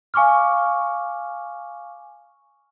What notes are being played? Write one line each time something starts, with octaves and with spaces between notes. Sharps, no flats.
F5 G#5 C#6 D6 F6